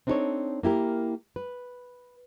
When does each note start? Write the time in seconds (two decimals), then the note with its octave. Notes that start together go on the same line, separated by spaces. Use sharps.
0.07 C4 D4 D#4 G#4 A4 C#5
0.63 A#3 E4 G4 A#4
1.36 B4